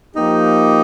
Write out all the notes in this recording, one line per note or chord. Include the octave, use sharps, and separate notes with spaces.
F3 A#3 D#4 G4